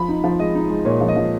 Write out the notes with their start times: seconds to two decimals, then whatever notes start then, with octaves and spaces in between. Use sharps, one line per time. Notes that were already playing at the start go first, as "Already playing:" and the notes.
Already playing: F3 B5
0.08 D#4
0.24 F3
0.39 G#3 D#5
0.55 D#4
0.70 G#3
0.85 A#2 C#5
1.01 F3
1.08 D#5
1.16 F3